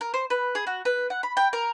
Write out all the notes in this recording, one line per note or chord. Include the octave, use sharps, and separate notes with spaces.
A#4
C5
B4
G#4
F#4
B4
F#5
B5
G5
A#4